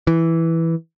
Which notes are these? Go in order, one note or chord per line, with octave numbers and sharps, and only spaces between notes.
E3